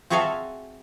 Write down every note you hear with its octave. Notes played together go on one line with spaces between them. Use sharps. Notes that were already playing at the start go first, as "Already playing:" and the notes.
C4 F#4 G#4 A4 E5 F5